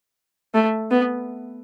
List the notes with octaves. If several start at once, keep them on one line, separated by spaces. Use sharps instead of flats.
A3
B3